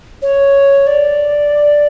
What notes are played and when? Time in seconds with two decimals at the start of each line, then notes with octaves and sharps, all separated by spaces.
0.22 C#5
0.87 D5